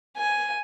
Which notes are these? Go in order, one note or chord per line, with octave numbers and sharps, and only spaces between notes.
G#5